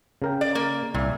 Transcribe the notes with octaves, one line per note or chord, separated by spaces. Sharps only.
C#3 A#4 G5
D5
A#3
C2 A#2 E5